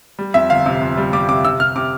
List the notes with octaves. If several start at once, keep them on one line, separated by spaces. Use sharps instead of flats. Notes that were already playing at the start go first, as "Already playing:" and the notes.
G3
F2 E5
G1 F5
C3
F2
G3
G3 D6
C3 D6
C3 E6
C3 F6
C3 D6